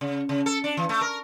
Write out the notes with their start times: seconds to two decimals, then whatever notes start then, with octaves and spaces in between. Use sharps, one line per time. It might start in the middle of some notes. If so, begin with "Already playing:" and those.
0.01 C#3
0.29 C#3
0.46 A4
0.64 D4
0.77 E3
0.89 A3
1.01 A#4